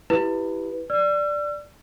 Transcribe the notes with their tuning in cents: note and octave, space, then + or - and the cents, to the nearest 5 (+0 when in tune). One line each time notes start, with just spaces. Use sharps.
E4 +0 G4 -10 B4 +0
D5 +0 E6 +45